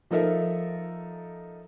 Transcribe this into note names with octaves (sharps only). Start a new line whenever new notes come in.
F3 D#4 A4 A#4 E5